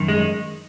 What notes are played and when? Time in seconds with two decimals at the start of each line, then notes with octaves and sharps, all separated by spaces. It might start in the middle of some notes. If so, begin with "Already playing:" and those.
Already playing: F#2 D#3
0.08 G#3